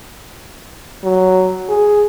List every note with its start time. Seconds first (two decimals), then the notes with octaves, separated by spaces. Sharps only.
1.04 F#3
1.69 G#4